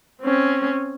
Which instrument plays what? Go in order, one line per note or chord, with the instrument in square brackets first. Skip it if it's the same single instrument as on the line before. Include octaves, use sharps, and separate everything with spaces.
[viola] C4 C#4